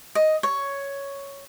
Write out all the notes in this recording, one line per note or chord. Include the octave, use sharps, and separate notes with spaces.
D#5
C#5